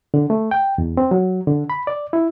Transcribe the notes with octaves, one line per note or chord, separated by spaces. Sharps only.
D3
A3
G5
E2
C4
F#3
D3
B5
D5
E4